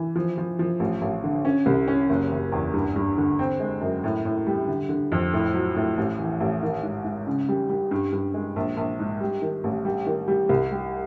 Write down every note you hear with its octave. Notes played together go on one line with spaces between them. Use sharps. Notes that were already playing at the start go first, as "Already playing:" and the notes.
Already playing: E3
F3
F3
F3
A1
A1
D3
C#4
C2
C#4
F#1
F#1
E2
G2
G2
D3
C4
G#3
F#2
A2
A2
G3
D3
D3
F2
A2
F#3
A2
A1
E3
A1
D#3
G#2
G#2
C#3
G3
G3
G2
G2
G#3
A#1
A#1
G#2
G3
D#3
A1
G3
D#3
G3
C2
G3